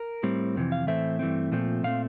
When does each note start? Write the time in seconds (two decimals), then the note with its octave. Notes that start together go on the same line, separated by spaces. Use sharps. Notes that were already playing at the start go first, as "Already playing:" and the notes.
Already playing: A#4
0.23 A2 G3 C4
0.56 F2 C3 E3
0.72 F5
0.87 A2 E3 A3 C4 E5
1.19 G2 E3 A3 C4
1.52 A#2 F3 A3 C4
1.83 A#2 A3 C4 F5